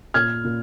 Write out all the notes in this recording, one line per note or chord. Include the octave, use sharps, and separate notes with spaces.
A#2 F6 G#6
A#2